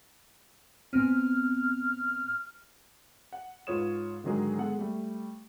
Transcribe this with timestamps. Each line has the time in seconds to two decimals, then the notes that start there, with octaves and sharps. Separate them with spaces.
0.93 A2 B3 C4 F6
3.33 F#5
3.67 G#2 F4 B4 C#5 D#6 E7
4.24 G#2 D3 D#3 F#3 G#3 G#4
4.58 G#3 B3 G#4 A4 F#5
4.79 G3 A3